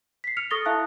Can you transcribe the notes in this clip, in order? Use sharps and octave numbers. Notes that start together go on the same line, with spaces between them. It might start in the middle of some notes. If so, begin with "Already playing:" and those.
B6 C7
F6 C#7 F7
A4 C#6 D#6 A6 A#6 G7
E4 E5 F5 A5 F#6